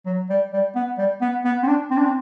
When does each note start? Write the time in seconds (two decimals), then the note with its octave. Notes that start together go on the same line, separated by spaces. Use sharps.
0.06 F#3
0.30 G3
0.53 G3
0.75 B3
0.98 G3
1.21 B3
1.44 B3
1.63 C4
1.67 D4
1.90 C4
1.97 D4
2.04 C4